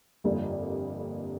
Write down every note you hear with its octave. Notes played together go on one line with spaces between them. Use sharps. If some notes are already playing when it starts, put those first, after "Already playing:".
G1 F2 D3 G3 A#3